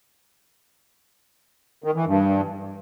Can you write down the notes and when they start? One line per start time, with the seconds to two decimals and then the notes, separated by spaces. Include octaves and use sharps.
1.84 D#3
1.95 E3
2.07 G2